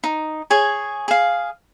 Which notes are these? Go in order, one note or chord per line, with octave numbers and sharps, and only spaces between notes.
D#4
G#4 C#5
G#4 F5